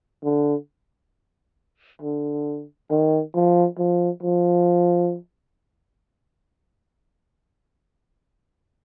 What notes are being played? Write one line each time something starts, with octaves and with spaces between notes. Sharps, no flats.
D3
D3
D#3
F3
F3
F3